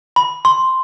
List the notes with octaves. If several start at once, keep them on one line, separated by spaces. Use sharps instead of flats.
B5
C6